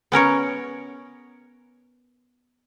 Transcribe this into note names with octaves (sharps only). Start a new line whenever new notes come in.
B3 C#4 A#4 C#5